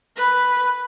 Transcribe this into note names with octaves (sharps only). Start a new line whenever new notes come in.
B4